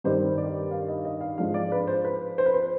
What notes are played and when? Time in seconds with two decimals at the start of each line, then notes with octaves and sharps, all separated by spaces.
0.04 G2 D#3 G3 C5
0.38 D5
0.71 F5
0.88 D#5
1.05 D#5
1.21 F5
1.38 G#2 F3 G#3 D4 F5
1.54 D5
1.72 B4
1.87 C5
2.05 B4
2.38 C5
2.46 B4
2.54 C5